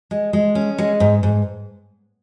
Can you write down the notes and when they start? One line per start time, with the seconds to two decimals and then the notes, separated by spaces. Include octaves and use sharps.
0.11 G#3
0.33 G#3
0.55 C#4
0.78 G#3
1.00 G#2
1.23 G#2